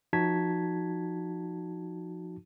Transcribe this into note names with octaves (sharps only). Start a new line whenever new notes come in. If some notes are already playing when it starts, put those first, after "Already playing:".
F3 D#4 F#4 A5 G#6 B6